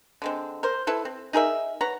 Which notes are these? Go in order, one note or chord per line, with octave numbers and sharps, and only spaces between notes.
D3 G#3 C4
A#4 C5
E4 A4 B4
C4
D#4 G#4 A#4 E5
B4 C#5 F#5 A#5